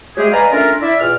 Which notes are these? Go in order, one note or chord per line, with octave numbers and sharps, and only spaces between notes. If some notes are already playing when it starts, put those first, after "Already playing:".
F#3 G#3 A3 G4 G#4
B4 D5 D#5 F5 G#5 A#5
A3 C#4 D4 F4 A#4
E4 D5 E5
E2 A#2 D5 F6